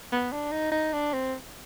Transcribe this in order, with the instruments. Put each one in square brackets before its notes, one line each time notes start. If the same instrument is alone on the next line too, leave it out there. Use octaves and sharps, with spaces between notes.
[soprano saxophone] B3
D4
D#4
D#4
D4
C4